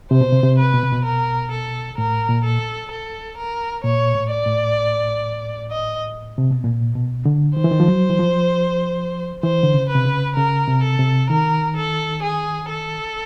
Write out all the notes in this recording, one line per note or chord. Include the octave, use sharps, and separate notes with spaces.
C3 C5
B2
C3
C3
B4
B2
C3
B2
A#4
A4
A2 A#4
A#2
A4
A4
A#4
A#2 C#5
A2
D5
A2
D#5
C3
B2
A#2
B2
D3
D#3 C5
E3
D#3
F3
F#3
E3
F3
E3 C5
D3
C#3
B4
C3
C#3
C#3 A#4
C3
A4
C3
D#3 A#4
A4
G#4
A4